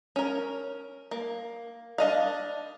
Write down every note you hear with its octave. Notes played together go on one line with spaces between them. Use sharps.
C#4 A#4
A#3
D4 D#5 F5